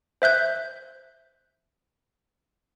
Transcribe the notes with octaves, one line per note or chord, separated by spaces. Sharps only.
C5 E5 F#6 G6